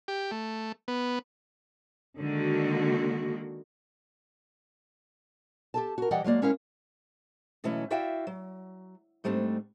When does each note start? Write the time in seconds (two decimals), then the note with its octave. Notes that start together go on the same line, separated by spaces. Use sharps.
0.08 G4
0.31 A3
0.88 B3
2.18 D3 D#3 G#3 A#3 F#4
5.74 G4 A4 A5
5.98 F#4 A#4
6.11 E3 G3 D5 D#5 F#5 G5
6.24 F#3 G#3 A#3 D5
6.42 G#3 C#4 E4 A#4 C#5 F5
7.64 B2 E3 F#3 A3 C#4 E4
7.90 E4 F#4 D5 E5 F5 G5
8.27 F#3
9.24 G#2 G3 A3 C4 D4